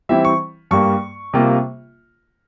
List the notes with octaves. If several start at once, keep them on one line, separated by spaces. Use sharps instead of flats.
E3 G3 C4 E4 E5
C#6
G2 G3 A#3 C#6
C3 G3 A#3 F4